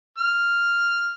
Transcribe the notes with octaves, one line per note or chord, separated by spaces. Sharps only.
F6